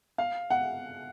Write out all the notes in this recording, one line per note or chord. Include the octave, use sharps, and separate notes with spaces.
F5
F#5